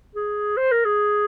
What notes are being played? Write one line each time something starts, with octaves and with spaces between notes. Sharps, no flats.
G#4
C5
A#4
G#4